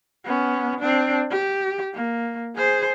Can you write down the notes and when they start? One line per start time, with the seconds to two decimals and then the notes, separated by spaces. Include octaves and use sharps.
0.25 B3 C#4
0.80 C4 D4
1.30 G4
1.94 A#3
2.57 G#4 C5